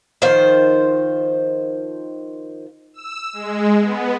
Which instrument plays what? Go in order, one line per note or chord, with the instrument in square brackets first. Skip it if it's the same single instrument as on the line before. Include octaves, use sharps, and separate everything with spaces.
[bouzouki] D#3 F3 C5
[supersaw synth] E6
G#3
B3